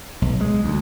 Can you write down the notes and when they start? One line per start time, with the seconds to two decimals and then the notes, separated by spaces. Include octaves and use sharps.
0.22 B1
0.41 G#3
0.64 D2